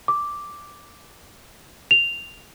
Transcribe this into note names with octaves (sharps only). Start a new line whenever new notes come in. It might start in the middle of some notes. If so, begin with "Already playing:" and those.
D6
F7